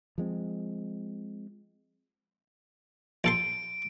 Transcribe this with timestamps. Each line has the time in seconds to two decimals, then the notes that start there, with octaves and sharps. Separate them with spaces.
0.18 F3 G#3 C4
3.24 A#1 A4 C6 D7